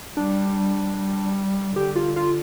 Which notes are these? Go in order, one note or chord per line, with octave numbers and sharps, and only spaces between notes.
G3 D4
G3
D3 G4
F4
F4